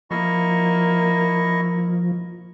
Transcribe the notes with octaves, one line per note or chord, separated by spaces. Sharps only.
F3 A#3 E4 D#5 C#6